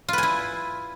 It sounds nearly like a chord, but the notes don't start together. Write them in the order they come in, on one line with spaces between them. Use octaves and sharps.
F4 B4 G#5 E4